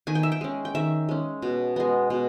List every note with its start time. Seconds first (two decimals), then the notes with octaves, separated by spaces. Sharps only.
0.07 D#3 G#5
0.15 G5
0.23 E5
0.32 G5
0.41 G#3 C#4
0.65 G5
0.75 D#3 E5
1.09 G#3 C#4
1.42 B2
1.76 G#3 B3
2.10 B2